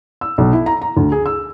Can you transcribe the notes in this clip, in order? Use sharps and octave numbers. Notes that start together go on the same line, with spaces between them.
E6
B1
E4
A#5
A#5
D2
G#4
E6